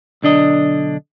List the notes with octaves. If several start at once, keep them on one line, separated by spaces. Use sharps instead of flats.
B1 D3 D4 D#5